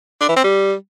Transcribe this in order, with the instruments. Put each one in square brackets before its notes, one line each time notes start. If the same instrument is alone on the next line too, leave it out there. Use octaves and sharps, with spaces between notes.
[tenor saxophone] D4
E3
C4
G3